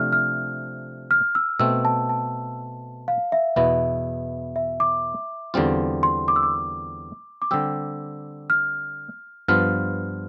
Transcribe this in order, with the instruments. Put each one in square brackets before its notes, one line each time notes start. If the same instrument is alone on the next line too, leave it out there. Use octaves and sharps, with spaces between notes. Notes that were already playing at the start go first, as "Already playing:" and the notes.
Already playing: [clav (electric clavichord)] C3 F3 A3 D4 [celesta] F6
[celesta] F6
F6
E6
[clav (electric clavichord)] B2 A3 C4 [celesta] E6
[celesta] A5
A5
F5
E5
[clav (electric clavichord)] E2 B2 B3 E4 [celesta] E5
[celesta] E5
D6
[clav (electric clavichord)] E2 D3 G3 C4 F4
[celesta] C6
D6
E6
D6
D6
[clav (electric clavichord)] D3 G3 C4 G4 [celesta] E6
[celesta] F6
[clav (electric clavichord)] G2 F3 B3 F4 [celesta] F6